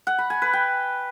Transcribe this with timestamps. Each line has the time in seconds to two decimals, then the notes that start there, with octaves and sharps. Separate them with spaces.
0.07 F#5
0.18 B5
0.30 G#5
0.42 B4
0.53 G5